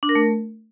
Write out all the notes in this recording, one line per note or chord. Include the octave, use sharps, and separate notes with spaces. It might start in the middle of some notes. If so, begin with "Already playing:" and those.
D4
A#4
A3